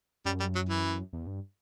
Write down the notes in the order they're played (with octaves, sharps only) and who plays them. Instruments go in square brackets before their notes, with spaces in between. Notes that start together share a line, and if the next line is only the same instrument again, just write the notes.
[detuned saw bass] F#2 [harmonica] G3
[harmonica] G3
F#3
E3
[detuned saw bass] E2
G2